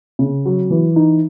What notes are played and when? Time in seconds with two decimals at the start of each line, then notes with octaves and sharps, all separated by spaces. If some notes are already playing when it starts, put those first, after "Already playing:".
0.19 C#3
0.46 F#3
0.70 E3
0.96 D#4